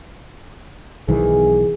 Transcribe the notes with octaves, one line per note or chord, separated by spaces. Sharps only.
B1 D#3 E3 G#4